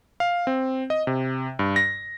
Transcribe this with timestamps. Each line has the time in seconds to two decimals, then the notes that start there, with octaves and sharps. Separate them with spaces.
0.20 F5
0.47 C4
0.90 D#5
1.07 C3
1.59 G2
1.76 A#6